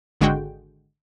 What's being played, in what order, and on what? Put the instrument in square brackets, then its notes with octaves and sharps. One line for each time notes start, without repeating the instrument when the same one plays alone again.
[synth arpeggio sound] G#1 D3 G#3 F#4 G5